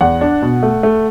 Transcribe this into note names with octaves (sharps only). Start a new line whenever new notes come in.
E2 F#5
D4
B2
A3
A3